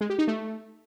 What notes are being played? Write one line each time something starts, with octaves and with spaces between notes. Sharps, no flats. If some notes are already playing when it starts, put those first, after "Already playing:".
G#3
G4
D#4
A3